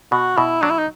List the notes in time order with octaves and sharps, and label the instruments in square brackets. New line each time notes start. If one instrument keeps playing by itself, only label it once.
[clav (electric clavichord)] B2 [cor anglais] F#4
[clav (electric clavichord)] B2 [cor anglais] E4
[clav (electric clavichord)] F#3 [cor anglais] D4
[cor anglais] E4
D#4